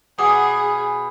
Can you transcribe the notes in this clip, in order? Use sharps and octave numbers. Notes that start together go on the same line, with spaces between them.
B2 G#4 F#5 D6 D#6